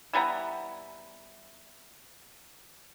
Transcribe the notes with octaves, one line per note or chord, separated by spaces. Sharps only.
E3 G3 B3 A#5